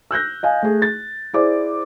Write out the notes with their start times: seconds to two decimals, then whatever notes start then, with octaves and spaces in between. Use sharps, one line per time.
0.11 E6 F#6 G6 A#6
0.43 D#5 F5 G#5
0.62 A3 G#4
0.82 A6
1.34 E4 G#4 C5 D5 D6